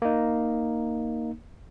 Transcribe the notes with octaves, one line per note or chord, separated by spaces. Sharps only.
A#3 D#4